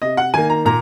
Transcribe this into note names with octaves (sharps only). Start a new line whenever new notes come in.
C3 D#5
F#5
D#3 A#3 G#5
A#5
A#2 A#5